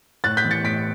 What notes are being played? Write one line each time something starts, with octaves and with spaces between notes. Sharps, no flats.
A2 F#6 A6
G6 B6
E3
A6 C#7
A2 B6 D7